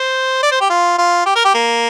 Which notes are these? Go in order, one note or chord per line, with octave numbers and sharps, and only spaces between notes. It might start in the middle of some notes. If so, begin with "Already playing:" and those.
Already playing: C5
D5
C5
G4
F4
F4
G4
A#4
G4
A#3